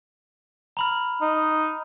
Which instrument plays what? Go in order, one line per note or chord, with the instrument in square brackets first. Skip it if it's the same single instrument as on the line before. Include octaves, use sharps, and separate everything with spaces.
[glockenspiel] A#5 B5 F6
[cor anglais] D#4